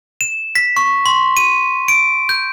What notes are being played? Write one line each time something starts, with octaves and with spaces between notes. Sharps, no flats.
E7
B6
C#6
C6
D#7
D7
G6